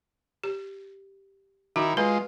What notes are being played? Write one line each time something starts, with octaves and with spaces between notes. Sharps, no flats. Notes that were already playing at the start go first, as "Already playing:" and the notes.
G4
D#3 E4 F#4
G#3 F4 B4